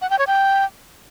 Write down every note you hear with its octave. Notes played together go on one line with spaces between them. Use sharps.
F#5
G5
C#5
G5